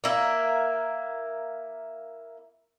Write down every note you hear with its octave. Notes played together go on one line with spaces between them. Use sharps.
A#3 E4